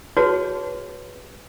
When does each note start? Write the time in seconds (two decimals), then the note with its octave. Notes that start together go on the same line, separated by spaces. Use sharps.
0.17 F#4 G#4 B4 C#5 A5